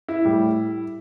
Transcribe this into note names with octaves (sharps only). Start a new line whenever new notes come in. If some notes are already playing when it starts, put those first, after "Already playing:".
E4
A2 G3